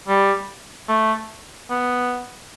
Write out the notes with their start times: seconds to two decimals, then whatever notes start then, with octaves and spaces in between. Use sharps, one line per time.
0.08 G3
0.89 A3
1.70 B3